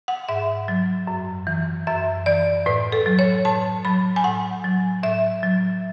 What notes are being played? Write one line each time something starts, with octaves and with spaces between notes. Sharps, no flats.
F#5
G#2 E5
F#3
F#2
E3
F#2 E5
E3 D5
A2 B4
A4
F#3
C#5
A2 A5
F#3 B5
G#5
A2 F#5
F#3
A2 E5
F#3